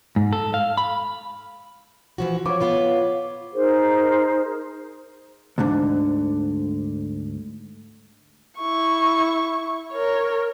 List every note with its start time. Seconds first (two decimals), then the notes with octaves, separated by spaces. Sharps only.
0.16 G#2
0.33 A4
0.54 F5
0.77 B5
2.18 E3 F3 F#4
2.46 F3 C#5 D6
2.60 B3 F4 B4
3.54 D#4 G#4 A#4 C5
5.58 D2 G#2 D3
8.58 E4 C#6
9.92 A#4 C#5